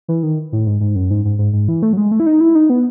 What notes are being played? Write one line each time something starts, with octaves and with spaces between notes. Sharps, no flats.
E3
D#3
A2
G#2
G#2
F#2
G#2
G#2
G#2
G#2
E3
A3
F#3
G#3
A3
E4
D#4
E4
D#4
B3